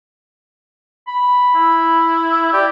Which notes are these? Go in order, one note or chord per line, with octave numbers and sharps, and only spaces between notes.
B5
E4
G4 D5